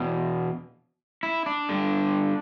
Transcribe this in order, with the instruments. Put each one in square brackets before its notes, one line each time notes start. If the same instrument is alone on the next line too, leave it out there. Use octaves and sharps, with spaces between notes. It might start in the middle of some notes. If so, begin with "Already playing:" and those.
Already playing: [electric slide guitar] E2 B2
E4
D4
G2 D3